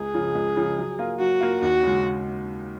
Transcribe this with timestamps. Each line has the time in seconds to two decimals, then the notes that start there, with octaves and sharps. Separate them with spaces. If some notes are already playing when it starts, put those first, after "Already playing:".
Already playing: C#2 G#4
0.14 C#3 F3
0.35 C#2
0.56 C#3 F3
0.78 F#3
0.98 A#3 F4
1.20 F#3 F#4
1.40 A#3 F4
1.62 D#2 F#4
1.83 C#3 G#3